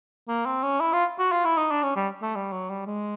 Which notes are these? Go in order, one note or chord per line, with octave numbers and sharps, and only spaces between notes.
A#3
C4
C#4
E4
F4
F#4
F4
E4
D#4
D4
C#4
G3
A3
G3
F#3
G3
G#3